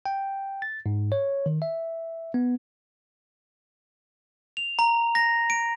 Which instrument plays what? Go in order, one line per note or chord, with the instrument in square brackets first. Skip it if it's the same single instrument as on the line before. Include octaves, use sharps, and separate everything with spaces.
[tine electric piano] G5
A6
G#2
C#5
D#3
E5
B3
[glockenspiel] F7
A#5
A#6
D7